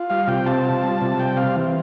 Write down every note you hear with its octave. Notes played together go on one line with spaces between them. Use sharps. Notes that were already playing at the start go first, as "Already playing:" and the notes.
Already playing: F4
G3 F5
C3 G5
C4 A5
F4
G3
C3
G3 G5
C4 F5
E3